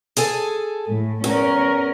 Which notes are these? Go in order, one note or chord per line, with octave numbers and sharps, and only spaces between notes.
G#4 A4 G#5
A2
E2 C#4 A#4